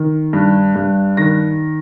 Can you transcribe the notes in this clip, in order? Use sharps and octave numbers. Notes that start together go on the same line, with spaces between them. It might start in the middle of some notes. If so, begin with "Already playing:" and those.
Already playing: D#3
G2
G2
D#3 A#6